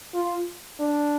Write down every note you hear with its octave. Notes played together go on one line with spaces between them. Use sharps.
F4
D4